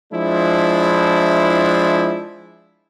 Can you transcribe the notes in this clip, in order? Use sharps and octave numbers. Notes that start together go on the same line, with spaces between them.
F3 G#3 D4 E4